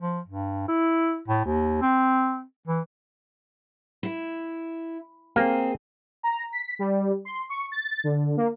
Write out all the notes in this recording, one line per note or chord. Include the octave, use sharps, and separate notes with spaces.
F3
G2
E4
A2
D#2
C4
E3
E4
A#3 C4 G#4 F5
A#5
B6
G3
C6
C#6
A6
D3
A#3